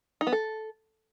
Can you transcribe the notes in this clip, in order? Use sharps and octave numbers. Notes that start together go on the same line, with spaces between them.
D#4
B3
A4